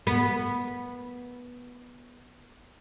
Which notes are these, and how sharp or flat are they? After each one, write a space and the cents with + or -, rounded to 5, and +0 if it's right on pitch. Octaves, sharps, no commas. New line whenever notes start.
B3 -10